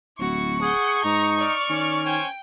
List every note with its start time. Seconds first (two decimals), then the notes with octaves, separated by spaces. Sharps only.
0.19 D1 E4 F#4 C#6
0.62 G#4 F#5 G6
1.04 G#2 D#4 A#5
1.39 D5 F6
1.70 D#3 C#4
2.06 C5 C#5 G5 G#5